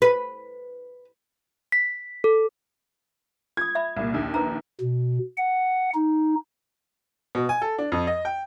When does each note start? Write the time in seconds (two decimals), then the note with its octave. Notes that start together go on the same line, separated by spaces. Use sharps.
0.02 B4
1.72 B6
2.24 A4
3.57 F4 D#6 G#6
3.75 E5 B5
3.97 C2 A#2
4.14 A#1 D#2
4.34 A#4 B4 A#5
4.81 B2
5.37 F#5
5.94 D#4
7.35 B2
7.49 G#5
7.62 A4
7.78 D4
7.92 F2
8.07 D#5
8.25 G5